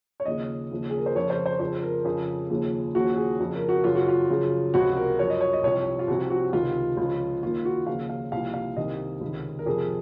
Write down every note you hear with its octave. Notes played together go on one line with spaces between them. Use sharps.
C#5
D#2 C#3 F3 D#5
D#2 C#3 F3
G#4
A#4
C5
F2 C#3 F3 C#5
C5
C5
F2 C#3 F3 C5
A#4
F2 C#3 F3 G#4
D#2 C#3 F3
D#2 C#3 F3 F#4
G#4
F2 C#3 F3
A#4
F#4
F#2 C#3 F3 F4
F#4
F4
F#2 C#3 F3
C#2 C3 F3 F#4
A#4
F#2 F3 C#5
D#5
C#5
D#5
C2 C3 F3 C#5
F4
C2 C3 F3 F#4
F#4
C#2 C3 D#3 F4
C#2 C#3 F3
D#2 D#3 F4
F#4
D#2 C#3 F3 F5
F5
C2 A#2 F3 F5
F5
C2 C3 D#3 D#5
C#2 C3 D#3
A#4
F2 C3 F3 G#4